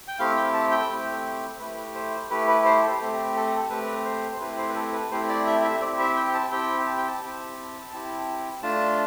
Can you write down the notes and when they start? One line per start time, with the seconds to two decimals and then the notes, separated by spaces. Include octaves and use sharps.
0.08 G5
0.19 A3 C4 E4 G4 F5
0.36 G5
0.54 A5
0.71 G5
0.90 A3 C4 E4 G4
1.60 A3 E4 G4 B4
1.95 C5
2.30 A3 E4 G4 B4
2.48 B4
2.65 C5
2.82 A4
3.00 A3 C4 G4
3.36 A4
3.70 A3 C4 G4 B4
4.05 C5
4.32 C5
4.40 A3 C4 E4 G4 B4
4.58 C5
4.69 B4
4.76 A4
4.93 B4
5.11 A3 C4 E4 G4 C5
5.29 D5
5.47 E5
5.64 E5
5.81 C4 E4 G4 D5
5.99 E5
6.16 G5
6.34 A5
6.51 C4 E4 G4 G5
6.87 A5
6.98 G5
7.07 A5
7.21 C4 E4 G4
7.93 C4 E4 G4
8.62 A3 D4 F4 A5